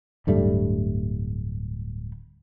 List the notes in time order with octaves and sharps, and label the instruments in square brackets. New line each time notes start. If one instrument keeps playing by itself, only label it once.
[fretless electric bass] D1 G2 G3 A3